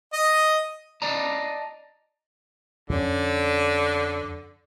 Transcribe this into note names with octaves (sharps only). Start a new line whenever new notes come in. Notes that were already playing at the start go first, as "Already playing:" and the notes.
D#5
D5 D#5 A5 A#5
F2 D3 C#4